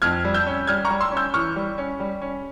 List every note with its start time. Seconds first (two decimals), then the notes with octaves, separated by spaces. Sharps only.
0.02 F2 F6 G#6
0.25 G3
0.34 E6 G6
0.47 C#4
0.67 G3 F6 G#6
0.85 A#5 C#6
0.90 G3
1.01 C6 E6
1.12 C#4
1.17 E6 G6
1.34 E3 C#6 F6
1.56 G3
1.78 C#4
2.00 G3
2.22 C#4